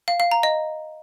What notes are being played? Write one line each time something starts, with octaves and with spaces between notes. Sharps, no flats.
F5
F5
A#5
D#5